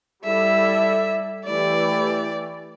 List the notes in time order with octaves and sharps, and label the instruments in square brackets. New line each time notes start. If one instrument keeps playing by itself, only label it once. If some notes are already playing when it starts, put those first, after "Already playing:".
[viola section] G3 E4 A4 D5 [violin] E5
[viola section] E3 A3 E4 G4 [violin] D5